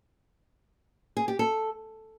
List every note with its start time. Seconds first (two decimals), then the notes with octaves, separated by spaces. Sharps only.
1.17 G#4
1.28 G4
1.39 A4